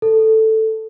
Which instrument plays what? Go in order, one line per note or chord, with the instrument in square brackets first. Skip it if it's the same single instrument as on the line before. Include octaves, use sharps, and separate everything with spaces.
[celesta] A4